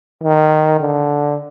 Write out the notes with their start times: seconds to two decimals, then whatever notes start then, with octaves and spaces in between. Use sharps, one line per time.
0.23 D#3
0.80 D3